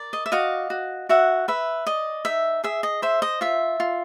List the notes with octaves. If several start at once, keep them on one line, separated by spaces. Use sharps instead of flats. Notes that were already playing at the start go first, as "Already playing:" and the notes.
Already playing: A#4 D5
D#5
E5
F#4 D#5 F5
F#4
F#4 E5 F#5
B4 E5
D5 D#5
D#4 E5
G#4 E5
D#5
C5 E5
D#5
F4 E5
F4